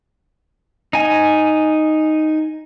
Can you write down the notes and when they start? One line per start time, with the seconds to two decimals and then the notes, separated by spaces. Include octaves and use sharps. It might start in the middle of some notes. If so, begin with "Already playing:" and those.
0.93 D#4 G#5